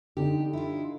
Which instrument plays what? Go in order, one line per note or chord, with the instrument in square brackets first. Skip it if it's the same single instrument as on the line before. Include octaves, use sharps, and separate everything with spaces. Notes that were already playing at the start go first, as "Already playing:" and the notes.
[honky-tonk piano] D3 D#4 [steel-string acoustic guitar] G4
[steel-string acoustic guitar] E4 F4